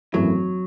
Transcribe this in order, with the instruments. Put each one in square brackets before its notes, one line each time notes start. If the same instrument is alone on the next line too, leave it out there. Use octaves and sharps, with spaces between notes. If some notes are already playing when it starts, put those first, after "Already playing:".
[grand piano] G#1 F#2 E3 A3 E4 [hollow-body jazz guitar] F#3